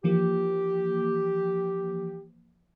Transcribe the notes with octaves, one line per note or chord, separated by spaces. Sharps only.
E3 F3 A#3 G4